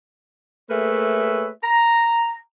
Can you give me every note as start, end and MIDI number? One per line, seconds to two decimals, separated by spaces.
0.70 1.50 57
0.70 1.50 58
0.70 1.50 68
0.70 1.50 71
0.70 1.50 73
0.70 1.50 76
1.64 2.37 82